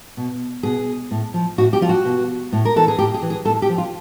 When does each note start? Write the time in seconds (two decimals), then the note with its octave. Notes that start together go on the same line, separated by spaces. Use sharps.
0.17 B2
0.63 B2 G#4
1.11 A2
1.34 F3
1.58 A2 F#4
1.73 G4
1.81 F3 F4
1.89 F#4
2.05 B2
2.52 A2
2.65 A#4
2.76 E3 A4
2.88 G#4
2.99 A2 G4
3.14 G#4
3.22 E3
3.30 G#4
3.45 A2 A4
3.62 G4
3.69 F3
3.78 F4